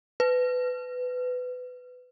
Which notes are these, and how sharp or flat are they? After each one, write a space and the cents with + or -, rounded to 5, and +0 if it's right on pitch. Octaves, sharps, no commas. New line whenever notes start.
B4 +20